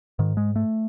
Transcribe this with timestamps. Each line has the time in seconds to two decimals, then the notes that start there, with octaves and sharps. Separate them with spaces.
0.19 G#2 D#3
0.37 G#3
0.56 A3